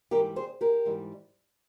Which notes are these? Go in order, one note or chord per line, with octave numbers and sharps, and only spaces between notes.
G#2 E3 G3 G4 A#4
G#4 C5
G4 A#4
G#2 E3 G3